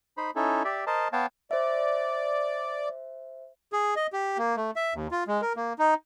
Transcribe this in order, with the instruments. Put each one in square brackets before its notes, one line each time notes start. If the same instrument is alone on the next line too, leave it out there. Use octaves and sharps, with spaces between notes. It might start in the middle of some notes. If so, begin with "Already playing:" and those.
[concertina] D#4 C5 B5
C#4 D#4 E4 A4
G4 D5 E5
A#4 C5 D#5 A5
B3 C#5 F5 G5 A5
[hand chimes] C5 E5 [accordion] D5
[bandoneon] G#4
D#5
G4
A#3
A3
E5
D#2
F4
G#3
A#4
A#3
D#4